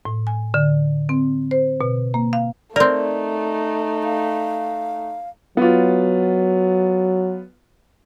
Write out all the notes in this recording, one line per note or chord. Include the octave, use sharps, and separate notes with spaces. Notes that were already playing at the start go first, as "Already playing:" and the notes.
A2
G#5
D3
C4
C5
B2
A#3
F5
A3 C4 D#4 A#4 D5
F5
F#3 B3 F4